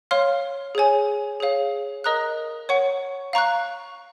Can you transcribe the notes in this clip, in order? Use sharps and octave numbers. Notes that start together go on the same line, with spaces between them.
C#5 F5 C6 F6
G#4 C#5 G#5
G#4 C#5 F5
A#4 D#5 A#5 D#6 F#6
C#5 F#5 C#6
F5 A#5 C#6 F#6